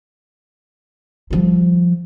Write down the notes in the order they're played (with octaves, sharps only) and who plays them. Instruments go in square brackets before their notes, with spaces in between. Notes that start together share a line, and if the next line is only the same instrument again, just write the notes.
[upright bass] F3 G3